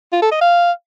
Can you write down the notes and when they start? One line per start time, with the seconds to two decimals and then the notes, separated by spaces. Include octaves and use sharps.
0.12 F4
0.22 A4
0.32 D#5
0.41 F5